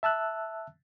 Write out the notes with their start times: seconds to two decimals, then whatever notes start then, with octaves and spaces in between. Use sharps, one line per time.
0.03 E5 A5 E6 F#6